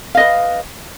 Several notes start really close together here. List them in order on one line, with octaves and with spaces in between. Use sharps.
F5 D#5 B4